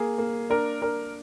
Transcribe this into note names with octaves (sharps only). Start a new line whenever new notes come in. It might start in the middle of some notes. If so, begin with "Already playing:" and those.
Already playing: A#3 G#4
A#3
D4 A#4
D4 A#4